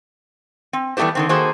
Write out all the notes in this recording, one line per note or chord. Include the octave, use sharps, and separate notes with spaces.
C4
E3 G3 A3 B3 G4 C5
D3 D#3 C4
D#3 A#3 F#4 G#4 A4 C5